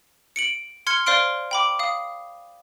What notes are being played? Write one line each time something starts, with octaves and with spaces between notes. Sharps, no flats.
C#7 D7 F#7
C6 F6 G#6 C#7
C5 D5 F5 C6 F6 D7
G5 B5 D6
F5 D#6